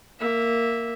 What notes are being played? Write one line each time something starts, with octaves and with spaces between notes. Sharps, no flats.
A#3 E5